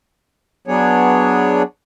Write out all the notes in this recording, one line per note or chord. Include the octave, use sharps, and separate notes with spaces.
F#3 B3 D4 G#4 C#5